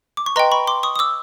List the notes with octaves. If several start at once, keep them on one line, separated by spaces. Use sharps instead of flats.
D6
C#6
B4 D#5 G5 A#5 C6
B5 C#6
C6 D6
C#6 D#6
D#6
D6 E6